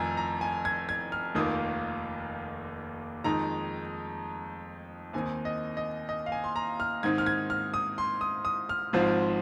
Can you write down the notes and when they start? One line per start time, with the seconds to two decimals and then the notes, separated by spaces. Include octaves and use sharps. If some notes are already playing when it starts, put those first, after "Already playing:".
Already playing: F1 F2 D#3 G#5 A#5
0.17 A#5
0.41 G#5
0.65 G#6
0.89 G#6
1.12 F6
1.35 F1 D#2 D#3 A#3 F4 D#6
3.24 F2 D#3 G#3 D#4 A#5
5.13 D#2 D#3 C4 D#4 G#5
5.45 D#5
5.77 D#5
6.09 D#5
6.26 F5
6.32 G#5
6.44 C6
6.56 A#5
6.80 F6
7.03 G#2 D#3 C4 D#4 G#6
7.18 F6
7.26 G#6
7.50 F6
7.74 D#6
7.98 C6
8.21 D#6
8.45 D#6
8.69 F6
8.93 G#1 G#2 F3 C4 F4